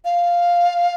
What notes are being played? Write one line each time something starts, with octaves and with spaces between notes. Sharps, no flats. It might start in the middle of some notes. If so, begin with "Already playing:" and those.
F5